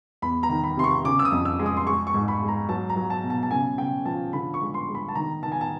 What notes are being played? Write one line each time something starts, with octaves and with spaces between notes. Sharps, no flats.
E2 B5
A#5
D#3
B5
C3 C6
C#6
C#3 D6
E6
D#6
F2
E6
G#3
D#6
C6
G#3 C#6
C#6
G#2
B5
G#3
A#5
F#3 A5
A#5
F#3
A5
B2
A5
A5
C#3 G#5
C#3 G5
F3 A5
D3 B5
C#6
G#3
C6
G#3
B5
A5
D#3 A#5
D#3 A5
G#5
A5